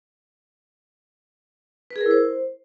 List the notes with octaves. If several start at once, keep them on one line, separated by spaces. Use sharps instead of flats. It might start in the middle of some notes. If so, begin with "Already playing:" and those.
B4
G#4
A#4
E4
C5